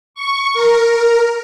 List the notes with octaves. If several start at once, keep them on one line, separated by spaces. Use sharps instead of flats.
C#6
A#4